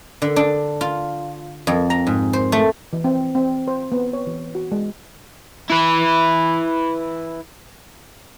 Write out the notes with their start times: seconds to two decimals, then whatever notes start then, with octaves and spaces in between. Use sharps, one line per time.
0.22 D3
0.36 D4
0.81 F4
1.67 F2
1.90 A#5
2.07 G#2
2.33 C5
2.52 A3
2.93 E3
3.04 C4
3.35 C4
3.68 C5
3.92 B3
4.13 C#5
4.27 E3
4.55 F#4
4.72 G#3
5.70 E4 B4